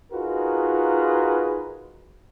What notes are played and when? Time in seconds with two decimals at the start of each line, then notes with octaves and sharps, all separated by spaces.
0.12 D#4 F4 F#4 G#4 A#4 B4